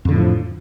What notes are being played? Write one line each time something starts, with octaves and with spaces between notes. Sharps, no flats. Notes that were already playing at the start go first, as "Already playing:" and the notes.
F2 A2 D3 F3